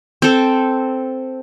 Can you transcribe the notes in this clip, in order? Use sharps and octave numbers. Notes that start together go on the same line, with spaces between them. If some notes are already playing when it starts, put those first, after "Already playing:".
C4 A4